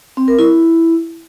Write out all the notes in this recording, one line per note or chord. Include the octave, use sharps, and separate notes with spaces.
C4
A#4
E4